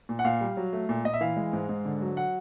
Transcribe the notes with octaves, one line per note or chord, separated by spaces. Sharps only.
A#2
F#5
A#2 F5
G3
F#3
A3
A#2
A#2 D#5
E5
E3 F5
G#3
G#2
G#2
D3
F#3
F#5